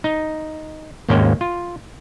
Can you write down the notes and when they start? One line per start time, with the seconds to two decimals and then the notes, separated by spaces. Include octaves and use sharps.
0.04 D#4
1.09 G#1 D#2 G#2 A#3 C#4 G5
1.41 F4